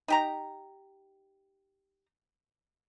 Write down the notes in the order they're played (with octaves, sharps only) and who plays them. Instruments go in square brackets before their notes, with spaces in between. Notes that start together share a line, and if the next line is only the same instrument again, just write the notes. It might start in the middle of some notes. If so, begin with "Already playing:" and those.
[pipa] D#4 G4 A#5